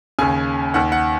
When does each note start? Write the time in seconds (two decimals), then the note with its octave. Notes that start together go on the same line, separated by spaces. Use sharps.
0.19 D#2 C#3 G#5
0.74 D#2 D#3 F#5
0.92 F#5